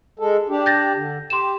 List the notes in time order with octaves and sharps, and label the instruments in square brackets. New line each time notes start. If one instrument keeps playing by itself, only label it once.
[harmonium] G#3 A4
D4 G4
[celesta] G6 A6 A#6
[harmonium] D3
[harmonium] G4 [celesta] C6 E7